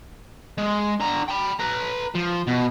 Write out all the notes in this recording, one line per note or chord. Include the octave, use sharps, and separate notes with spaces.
G#3
D3 A#5
G5 B5
B4 A#5
F3
B2